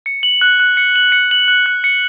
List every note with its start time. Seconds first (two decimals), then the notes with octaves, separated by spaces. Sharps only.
0.06 C#7
0.23 F#7
0.41 F#6
0.60 F#6
0.77 C#7
0.96 F#7
1.12 C#7
1.31 F#7
1.48 F#6
1.66 F#6
1.84 C#7